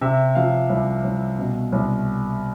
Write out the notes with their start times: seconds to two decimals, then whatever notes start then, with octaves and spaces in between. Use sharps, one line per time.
0.01 C3 E5
0.35 F3 F5
0.70 C2
1.04 C2
1.39 B2
1.72 C2